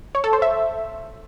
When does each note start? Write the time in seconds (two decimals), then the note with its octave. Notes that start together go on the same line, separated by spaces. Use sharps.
0.15 C#5
0.24 A4
0.33 C5
0.42 E5